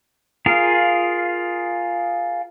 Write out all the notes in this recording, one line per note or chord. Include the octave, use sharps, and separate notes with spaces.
F4 G#4 A#4 F5